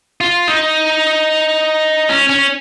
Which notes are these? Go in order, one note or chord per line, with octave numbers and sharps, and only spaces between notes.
F4
D#4
C#4
C#4